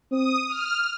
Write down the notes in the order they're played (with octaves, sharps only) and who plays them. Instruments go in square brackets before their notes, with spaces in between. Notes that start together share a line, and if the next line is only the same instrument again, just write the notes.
[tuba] C4 [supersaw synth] D#6
[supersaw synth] F6